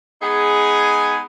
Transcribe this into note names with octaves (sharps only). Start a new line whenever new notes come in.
G#3 B3 D#4 G#4